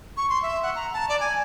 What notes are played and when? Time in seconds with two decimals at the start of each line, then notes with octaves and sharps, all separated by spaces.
0.17 C#6
0.30 C6
0.42 E5
0.63 F#5
0.76 A#5
0.93 A5
1.09 D5
1.20 G#5